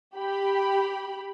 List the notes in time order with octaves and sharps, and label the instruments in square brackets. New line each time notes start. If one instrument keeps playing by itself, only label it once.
[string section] G4 B5